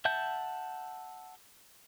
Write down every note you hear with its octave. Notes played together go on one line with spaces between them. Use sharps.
E5 F#5 A5 G6